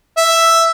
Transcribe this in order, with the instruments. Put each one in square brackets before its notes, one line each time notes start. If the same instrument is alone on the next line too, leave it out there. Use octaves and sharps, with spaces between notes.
[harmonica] E5